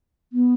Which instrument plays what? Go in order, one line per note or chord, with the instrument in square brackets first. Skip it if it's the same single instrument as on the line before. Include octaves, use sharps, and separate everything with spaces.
[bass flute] B3